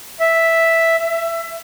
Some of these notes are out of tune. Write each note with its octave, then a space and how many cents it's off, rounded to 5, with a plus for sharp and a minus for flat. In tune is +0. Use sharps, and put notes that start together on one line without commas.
E5 +0
E5 +20